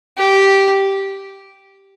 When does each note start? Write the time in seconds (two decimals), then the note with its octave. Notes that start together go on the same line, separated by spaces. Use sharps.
0.18 G4